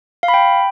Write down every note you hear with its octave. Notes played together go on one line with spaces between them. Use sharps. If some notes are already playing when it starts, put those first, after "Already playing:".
F5
B5
G5